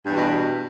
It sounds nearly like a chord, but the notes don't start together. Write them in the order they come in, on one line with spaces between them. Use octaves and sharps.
G2 E2 B2